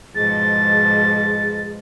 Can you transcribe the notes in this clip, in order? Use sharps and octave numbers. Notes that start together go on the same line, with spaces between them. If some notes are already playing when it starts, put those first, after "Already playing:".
G#2 B2 F3 G#4 A6